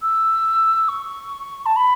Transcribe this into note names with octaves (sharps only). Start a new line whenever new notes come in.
E6
C#6
A5
B5